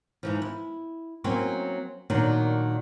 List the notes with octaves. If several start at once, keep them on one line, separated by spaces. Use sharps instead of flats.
G#2 E3 F3
E4
F#3 A#3 C4 C#4
A#2 D#3 F#3 D4